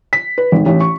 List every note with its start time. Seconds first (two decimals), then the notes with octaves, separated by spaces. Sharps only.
0.13 B6
0.38 B4
0.52 G#1
0.66 A1
0.81 C#6